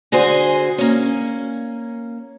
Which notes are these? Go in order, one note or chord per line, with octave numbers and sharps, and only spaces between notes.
D3 F#4 G#4 C5 G#5
A#3 C#4